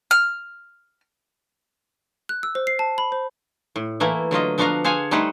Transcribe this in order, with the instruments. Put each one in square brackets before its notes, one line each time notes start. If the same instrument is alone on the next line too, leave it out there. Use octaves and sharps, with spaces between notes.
[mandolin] F6
[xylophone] F#6
E6
C5
C7
A5
B5
C5
[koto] A2
E3 A3 A#3 E4
D3 F#3 F4 D#5
F3 B3 D4 F#4 F5 A#5
G#4 C5 F5 F#5 G#5
G3 A3 D#4 B4 C5 F#5